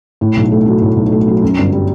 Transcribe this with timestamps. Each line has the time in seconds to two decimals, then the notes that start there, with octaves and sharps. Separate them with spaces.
0.21 A2
0.36 B1
0.52 A3
0.66 F#3
0.82 A2
0.96 B1
1.12 A3
1.28 F#3
1.42 F#2
1.58 G1
1.72 G3